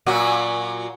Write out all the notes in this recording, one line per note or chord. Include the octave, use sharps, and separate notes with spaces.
A#2 F#3 F#4